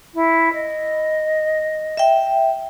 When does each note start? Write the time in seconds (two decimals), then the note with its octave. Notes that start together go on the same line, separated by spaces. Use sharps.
0.14 E4
0.53 D#5
1.97 E5 G5